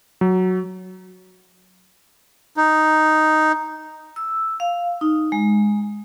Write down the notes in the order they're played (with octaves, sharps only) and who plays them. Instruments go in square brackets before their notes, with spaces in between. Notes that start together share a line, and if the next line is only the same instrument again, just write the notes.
[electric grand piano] F#3
[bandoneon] D#4
[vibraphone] E6
F5
D#4
G#3